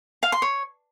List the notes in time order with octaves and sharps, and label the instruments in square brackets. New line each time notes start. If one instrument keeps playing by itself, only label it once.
[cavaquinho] F5
C6
C#5